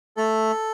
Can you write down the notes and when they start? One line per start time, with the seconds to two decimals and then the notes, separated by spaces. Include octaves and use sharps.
0.17 A3 A4